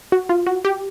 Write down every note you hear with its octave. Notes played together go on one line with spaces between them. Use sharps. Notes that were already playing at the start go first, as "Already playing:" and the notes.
F#4
F4
F#4
G4